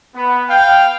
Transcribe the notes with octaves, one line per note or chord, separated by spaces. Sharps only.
B3
F5 G5